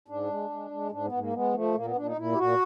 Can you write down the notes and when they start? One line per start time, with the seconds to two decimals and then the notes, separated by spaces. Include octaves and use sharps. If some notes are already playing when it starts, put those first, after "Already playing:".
0.08 G#2 D4
0.29 G#3
0.50 G#3
0.71 G#3
0.91 G#2 D4
1.05 B3
1.12 G#2
1.19 A#3
1.33 G#3 B3
1.54 F3 A3
1.75 A#2 A#3
1.86 B3
1.96 A#2 D4
2.06 D#4
2.17 A#2 E4
2.32 G4
2.38 A#2 F#4